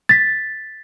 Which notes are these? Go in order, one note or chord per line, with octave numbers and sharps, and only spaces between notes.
A6 B6